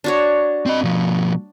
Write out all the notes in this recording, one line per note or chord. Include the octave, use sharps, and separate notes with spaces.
D4 F#4 C#5
C4 D#5
B2 F3